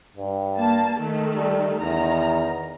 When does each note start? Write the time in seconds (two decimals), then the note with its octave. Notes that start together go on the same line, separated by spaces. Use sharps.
0.17 G2
0.57 A#3 A5
1.00 D#3 A3
1.35 G3
1.81 E2 D#3 A#5